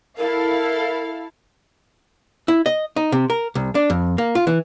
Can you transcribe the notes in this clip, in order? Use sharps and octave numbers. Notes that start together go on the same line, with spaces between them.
E4 A4 A#4 F5
E4
D#5
D#4
C3
A#4
C2
D4
F2
A#3
F4
E3